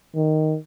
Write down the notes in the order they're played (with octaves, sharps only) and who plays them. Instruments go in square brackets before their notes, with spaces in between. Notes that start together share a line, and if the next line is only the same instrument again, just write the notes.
[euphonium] D#3